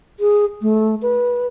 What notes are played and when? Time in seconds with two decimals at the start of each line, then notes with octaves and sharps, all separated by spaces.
0.20 G#4
0.62 A3
1.02 B4